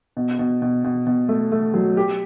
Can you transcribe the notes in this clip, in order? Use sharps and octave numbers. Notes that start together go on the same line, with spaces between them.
B2
B2
B2
B2
B2
A3
A3
F#3
G4